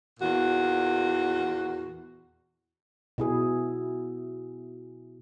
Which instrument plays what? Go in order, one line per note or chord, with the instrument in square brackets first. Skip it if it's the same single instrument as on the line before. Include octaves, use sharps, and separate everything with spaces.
[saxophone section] E2 A#2 F#4
[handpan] B2 E4 G#4